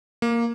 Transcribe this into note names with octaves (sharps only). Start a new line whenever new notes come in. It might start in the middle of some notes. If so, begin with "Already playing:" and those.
A#3